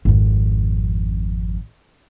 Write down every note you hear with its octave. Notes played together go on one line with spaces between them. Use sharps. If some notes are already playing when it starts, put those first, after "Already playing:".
G#1 F2